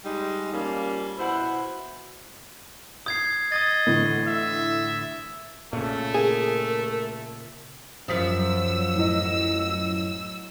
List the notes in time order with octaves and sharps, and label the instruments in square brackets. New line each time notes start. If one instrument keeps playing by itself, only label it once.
[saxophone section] G3 G#3 D#4
F3 G3 A#3 C#4
B2 E4 C5 F#5
[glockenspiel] D#6 G#6 C7 [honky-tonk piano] G6
[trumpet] D#5 [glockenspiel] D#6 G#6 A6
[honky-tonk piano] A2 D3 E3
[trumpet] E5
[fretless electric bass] A#2 C#3 [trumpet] A3
[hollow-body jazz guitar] G#4 [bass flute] A#4
[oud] F#2 F3 [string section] F#3 E6 [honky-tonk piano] D#6 B6
[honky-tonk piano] A2 D#5